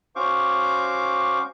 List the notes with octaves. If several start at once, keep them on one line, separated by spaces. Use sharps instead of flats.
C#4 F#4 C5 F5 C#6 D6